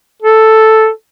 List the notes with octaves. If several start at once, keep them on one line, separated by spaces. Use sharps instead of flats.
A4